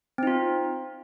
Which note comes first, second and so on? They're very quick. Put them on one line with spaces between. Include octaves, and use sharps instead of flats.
C4 D#4 F4